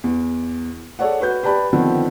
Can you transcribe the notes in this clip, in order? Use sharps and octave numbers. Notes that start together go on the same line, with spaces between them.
E2
G#4 A4 C#5 D5 F#5
F#4 B4 G6
G4 B4 D5 A5 B5
D3 D#3 F3 B3 C4